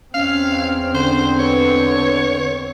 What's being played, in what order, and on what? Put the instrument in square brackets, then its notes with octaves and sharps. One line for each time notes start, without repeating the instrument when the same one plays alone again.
[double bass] E2 C4 [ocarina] C#4 [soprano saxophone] F5
[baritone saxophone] D3 [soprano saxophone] C5
[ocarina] B4 [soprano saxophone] C#5